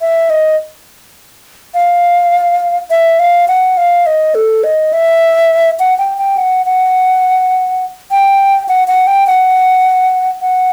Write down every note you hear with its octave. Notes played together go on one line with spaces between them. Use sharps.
E5
D#5
F5
E5
F5
F#5
F5
D#5
A4
D#5
E5
F#5
G5
G5
F#5
F#5
G5
F#5
F#5
G5
F#5
F#5